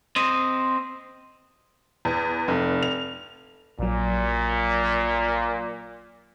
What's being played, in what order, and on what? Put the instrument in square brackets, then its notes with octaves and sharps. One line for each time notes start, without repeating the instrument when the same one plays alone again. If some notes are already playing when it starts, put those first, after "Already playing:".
[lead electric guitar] C4 D#5
[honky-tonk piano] E2
F1
F7
[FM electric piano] A#1 F#3 [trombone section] A#2